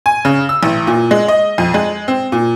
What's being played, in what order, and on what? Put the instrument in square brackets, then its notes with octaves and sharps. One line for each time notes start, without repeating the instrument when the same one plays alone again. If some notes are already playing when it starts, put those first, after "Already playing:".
[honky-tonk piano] G#5
C#3
E6
A1
A#2
G#3
D#5
F2
G#3
C4
A#2